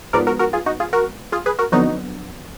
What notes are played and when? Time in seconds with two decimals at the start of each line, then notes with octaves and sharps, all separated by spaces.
0.13 G#2 F3 B3 A#4 D5
0.27 F#4 A#4
0.39 F#4 A#4
0.53 F4 G#4
0.66 D#4 F#4
0.80 F4 G#4
0.93 F#4 A#4
1.32 F4 G#4
1.46 G#4 B4
1.59 F#4 A#4
1.72 F2 D3 F#3 B3 D#4 F#4